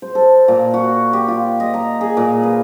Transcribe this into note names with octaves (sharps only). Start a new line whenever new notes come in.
C5
A4
A#2
F#4
G4
F4
D#5
A#5
G#4
A#2
B4